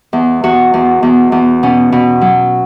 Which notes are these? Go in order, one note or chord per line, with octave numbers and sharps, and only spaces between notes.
E2
E2 F#4
E2
E2
E2
B2 C#4
B2
F#3